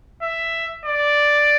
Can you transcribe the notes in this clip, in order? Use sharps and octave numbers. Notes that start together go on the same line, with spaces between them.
E5
D5